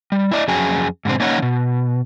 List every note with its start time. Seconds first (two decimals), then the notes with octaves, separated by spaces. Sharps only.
0.12 G3
0.31 E4 D5 D#5
0.48 F2 F#3 C#4 F#4 G#4 G#5
1.05 G#2 B2 D3 C4
1.20 A#3 C#4 D#4 C#5 D#5 F#5
1.38 B2 F3